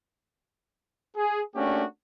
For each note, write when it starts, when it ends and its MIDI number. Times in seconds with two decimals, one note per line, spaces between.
1.17 1.41 68
1.56 1.84 57
1.56 1.84 58
1.56 1.84 61
1.56 1.84 62
1.56 1.84 66
1.56 1.84 67